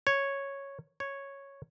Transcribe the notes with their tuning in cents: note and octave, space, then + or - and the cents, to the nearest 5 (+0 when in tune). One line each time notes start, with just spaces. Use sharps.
C#5 -5
C#5 -5